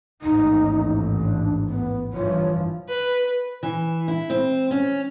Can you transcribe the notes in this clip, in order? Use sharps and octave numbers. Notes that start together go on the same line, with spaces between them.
A1 D#2 G#2 D#4
D4
B3
G2 E3 F3 C#5
B4
E3
E4
C4
C#4